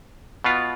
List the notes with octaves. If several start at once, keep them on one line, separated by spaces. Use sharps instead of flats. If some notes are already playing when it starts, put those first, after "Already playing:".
B2 B3 F4